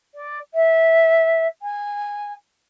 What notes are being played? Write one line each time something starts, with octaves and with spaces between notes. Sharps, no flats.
D5
E5
G#5